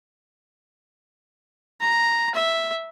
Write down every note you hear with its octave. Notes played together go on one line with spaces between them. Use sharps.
A#5
E5